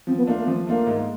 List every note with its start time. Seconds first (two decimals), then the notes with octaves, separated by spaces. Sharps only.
0.07 F3 C4
0.17 B3
0.27 A3 A#3 D4 F4
0.37 A#3
0.47 F3 C4
0.67 A3 A#3 D4 F4
0.87 G#2